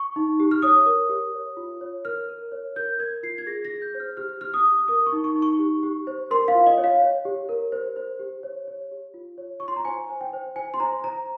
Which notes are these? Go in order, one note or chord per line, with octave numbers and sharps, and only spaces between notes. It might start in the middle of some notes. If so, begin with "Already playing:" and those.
Already playing: C#6
D#4
G4
F6
C#5 D#6
A#4
G4
C#5
F4
C#5
A#4 F6
A#4
C#5
A#4 G6
A#4 G#6
F4 C7
G#6
G#4 A#6
A#6
G#4
G6
C5
F6
G4 F6
G4 F6
D#6
G4
A#4 D#6
C#6
D#4
C#6
D#4
C#6
G4
G4
C5
A#4 C6
F5
F4
D#5
C#5
F5
C#5
G4
A#4
C5
C5
G4
C#5
C#5
G4
F4
C#5
F4 C#6
C6
A#5
C5 G#5
C5
G5
C5
C5 G#5
C6
C5 A#5
C5 A#5